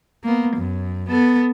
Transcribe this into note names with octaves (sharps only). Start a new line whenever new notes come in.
A#3 B3
F#2
B3 A4